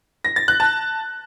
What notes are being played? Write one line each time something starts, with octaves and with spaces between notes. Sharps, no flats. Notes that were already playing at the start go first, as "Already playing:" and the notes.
A#6
A6
F#6
A5